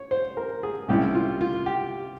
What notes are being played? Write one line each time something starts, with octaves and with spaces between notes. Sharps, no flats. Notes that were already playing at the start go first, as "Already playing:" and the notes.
Already playing: C#5
C5
A#4
G#4
C2 C3 G3 C#4 E4 G4
F4
F4
G4